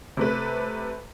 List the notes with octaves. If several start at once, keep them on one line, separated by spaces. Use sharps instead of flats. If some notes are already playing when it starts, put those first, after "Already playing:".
C3 A3 B4